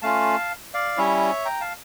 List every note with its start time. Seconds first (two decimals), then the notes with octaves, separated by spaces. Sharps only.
0.02 A3 C#4 F4 F5 A5
0.74 D5 F5
0.97 G3 C#4 E4 C#5 E5
1.45 G5 A#5
1.61 F5 A5